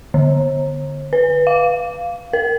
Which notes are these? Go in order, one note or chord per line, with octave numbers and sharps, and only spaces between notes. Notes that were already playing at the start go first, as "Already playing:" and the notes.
D3
B4
F5
A#4